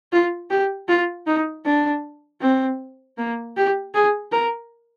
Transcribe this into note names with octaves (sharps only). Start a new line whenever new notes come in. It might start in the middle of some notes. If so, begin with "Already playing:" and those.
F4
G4
F4
D#4
D4
C4
A#3
G4
G#4
A#4